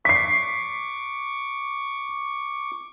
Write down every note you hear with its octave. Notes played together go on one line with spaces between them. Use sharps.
C#6 D6 B6 C7